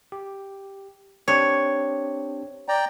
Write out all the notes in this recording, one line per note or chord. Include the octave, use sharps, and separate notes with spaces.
G4
C4 D4 G4 C#5
D5 G5 A#5